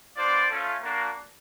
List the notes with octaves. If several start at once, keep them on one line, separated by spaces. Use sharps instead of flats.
B3 D4 F4 C5 D5
A3 C#4 F4
A#3 D4 F#4